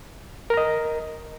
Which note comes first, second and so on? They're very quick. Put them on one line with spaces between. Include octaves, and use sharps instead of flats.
A#4 A#5 D#5